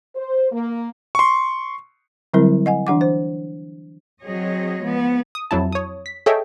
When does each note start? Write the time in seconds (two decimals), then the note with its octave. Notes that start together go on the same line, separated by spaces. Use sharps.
0.16 C5
0.52 A#3
1.15 C6 C#6
2.34 D3 F#3 G3 C4 E4 A#4
2.66 D#5 F#5 G#5
2.87 E3 D4 F#5 D6
3.01 C5
4.23 F#3 C4 G#4 C#5 D#5
4.82 F3 G#3 B3
5.35 D#6
5.51 F2 F#3 E4 A5
5.72 C#5 D#6
6.06 B6
6.26 G#4 A4 C#5 D#5 E5 G5